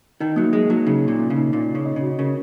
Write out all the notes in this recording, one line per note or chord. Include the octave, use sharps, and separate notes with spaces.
D#3 D#4
F#3 A#3
G#3 A#3
F#3 D#4
C#3 D#4
A#2 A#3
A#3
C#3
D#4
A#2 D#4
D#4
C#3
D#5
C#3
F#4
C#3 A#4